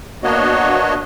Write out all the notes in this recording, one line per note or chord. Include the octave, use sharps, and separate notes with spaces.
A#3 B3 D4 F#4 C#5 D#5